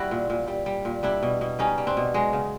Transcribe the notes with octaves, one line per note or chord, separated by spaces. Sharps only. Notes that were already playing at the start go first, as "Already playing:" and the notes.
Already playing: G3 E4 F#4
A#2
A#2
G3
G3
A#2
G3 D4 E4
B2
B2
G3 C#4 D#4
G3
C4 D4
B2
F#3 G#3
C#3